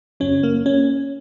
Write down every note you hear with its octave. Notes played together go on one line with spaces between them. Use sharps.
F#2 C#3 F#3 C#4
A#3
C#4